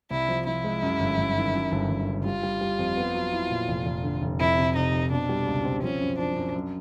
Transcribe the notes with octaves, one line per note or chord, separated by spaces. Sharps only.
C2 E4
F3
F3 E4
G#3
F#2
G1
G1
D#3
F#2
G1
G1
C#3
G3 F4
G3
G3
F2
B3
F#3
E4
A#2
F1
F1
D3
F1
F2 E4
C3
C3 D#4
F2
B2 D4
G3
C#2
C4
F3 C#4
F#2
F3 D4
F#2
F#2